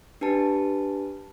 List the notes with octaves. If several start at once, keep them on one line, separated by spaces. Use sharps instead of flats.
D4 G4 B4 A5